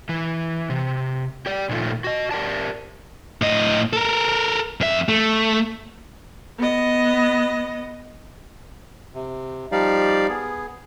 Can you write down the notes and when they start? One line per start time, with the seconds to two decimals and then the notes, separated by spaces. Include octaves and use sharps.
0.09 E3
0.70 C3
1.46 G4 D5
1.69 A#2 D#3 F3 A3 F4
2.04 F#4 D#5
2.31 G4 A#4 D5 A5
3.42 A2 D#5
3.93 A4 A#4
4.81 F2 E5
5.09 A3
6.58 B3 D#5
9.14 C3
9.72 F3 G3 D#4 G4 D5 F5
10.30 B3 G#4